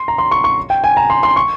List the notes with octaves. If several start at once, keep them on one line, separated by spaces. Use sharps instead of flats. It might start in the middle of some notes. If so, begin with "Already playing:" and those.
Already playing: C6
A#5
C6
C#6
C#6
G5
G#5
A#5
C6
C6
C#6